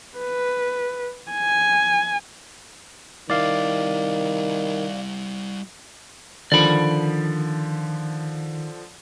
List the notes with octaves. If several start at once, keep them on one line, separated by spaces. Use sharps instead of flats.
B4
G#5
D#3 G3 E4 D5 F5
D3 D#3 F3 D5 B5 D7